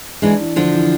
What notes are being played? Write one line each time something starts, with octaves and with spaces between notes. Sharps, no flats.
E3 G#3 D4
E3
D3 F3 D4
E3